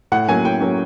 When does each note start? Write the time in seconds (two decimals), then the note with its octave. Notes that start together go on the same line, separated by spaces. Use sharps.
0.12 A2 F#5
0.28 F#3 A#3 C#4 G#5
0.45 A2 G5
0.61 F#3 A#3 C#4